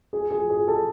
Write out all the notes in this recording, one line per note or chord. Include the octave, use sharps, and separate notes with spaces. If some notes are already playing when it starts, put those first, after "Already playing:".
G#4
G#4
G#4
A4